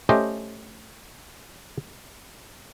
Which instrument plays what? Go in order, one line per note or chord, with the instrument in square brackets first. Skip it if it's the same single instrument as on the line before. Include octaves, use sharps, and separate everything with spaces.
[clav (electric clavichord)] A3 C#4 G4 C5 D#5 G5